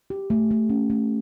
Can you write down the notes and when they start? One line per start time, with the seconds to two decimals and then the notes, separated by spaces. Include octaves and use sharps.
0.10 G4
0.30 A3
0.51 A3
0.70 C#4
0.90 A3